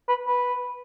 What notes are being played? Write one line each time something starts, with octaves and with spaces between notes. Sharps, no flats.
B4
B4